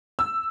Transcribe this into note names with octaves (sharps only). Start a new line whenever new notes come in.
E6